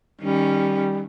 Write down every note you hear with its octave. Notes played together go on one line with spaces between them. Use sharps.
D#3 G3 C#4